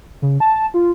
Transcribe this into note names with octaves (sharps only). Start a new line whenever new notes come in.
C#3
A5
F4